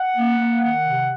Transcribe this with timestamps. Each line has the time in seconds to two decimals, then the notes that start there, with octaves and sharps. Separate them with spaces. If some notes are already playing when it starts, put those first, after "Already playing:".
Already playing: F#5
0.15 A#3
0.38 A#3
0.61 D#3 F#5
0.83 C3